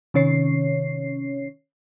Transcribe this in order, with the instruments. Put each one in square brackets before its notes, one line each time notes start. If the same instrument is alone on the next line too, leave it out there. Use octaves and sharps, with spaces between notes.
[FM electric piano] C3 D#3 C#4 C#5 C7